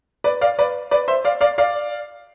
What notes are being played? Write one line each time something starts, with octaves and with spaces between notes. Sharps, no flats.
B4 D5
D5 F5
B4 D5
B4 D5
C5 E5
D5 F5
D5 F5
D5 F5